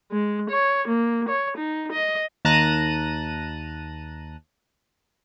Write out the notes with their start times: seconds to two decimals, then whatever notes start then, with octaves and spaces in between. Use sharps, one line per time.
0.12 G#3
0.50 C#5
0.88 A#3
1.29 C#5
1.58 D#4
1.92 D#5
2.45 D#2 A5 A#5 F#6 A#6 D#7